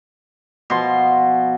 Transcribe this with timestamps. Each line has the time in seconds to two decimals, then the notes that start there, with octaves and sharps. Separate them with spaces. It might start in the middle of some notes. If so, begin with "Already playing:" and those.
0.70 B2 F3 C6